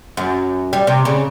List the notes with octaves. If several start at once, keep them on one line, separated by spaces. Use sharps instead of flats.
F#2
G3
C3
C#3